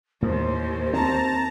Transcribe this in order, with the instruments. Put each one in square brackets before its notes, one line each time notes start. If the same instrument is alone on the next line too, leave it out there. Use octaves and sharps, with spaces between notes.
[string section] D#2 [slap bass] A2 A#3 [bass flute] C5
[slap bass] C4 [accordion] A5 A#5